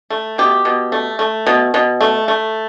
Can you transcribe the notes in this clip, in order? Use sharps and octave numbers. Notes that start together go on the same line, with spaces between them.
A3
B2 G4
B2
A3
A3
B2
B2
A3
A3